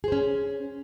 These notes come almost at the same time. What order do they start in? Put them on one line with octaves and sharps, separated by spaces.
G#4 C5 C#4